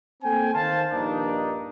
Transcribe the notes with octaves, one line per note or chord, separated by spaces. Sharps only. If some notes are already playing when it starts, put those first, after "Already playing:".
A#3 C4 A4 G5 G#5
D#3 C5 F5 A5
A#1 G2 A#3 D4 D#4